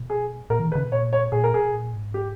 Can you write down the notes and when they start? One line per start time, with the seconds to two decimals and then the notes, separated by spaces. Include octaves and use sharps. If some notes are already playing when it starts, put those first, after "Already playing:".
Already playing: B2
0.10 G#4
0.50 A#2 A#4
0.60 E3
0.68 D#3
0.72 B4
0.75 C#3
0.84 B2
0.91 A#2 C#5
1.13 C#5
1.32 A#2 G#4
1.44 A#4
1.53 B2 G#4
1.74 A#2
1.93 G#2
2.14 G4